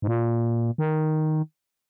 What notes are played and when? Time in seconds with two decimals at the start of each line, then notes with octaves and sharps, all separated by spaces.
0.02 G#2
0.07 A#2
0.78 D#3